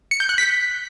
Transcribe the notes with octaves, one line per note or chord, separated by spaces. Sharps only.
C#7
G6
F#6
B6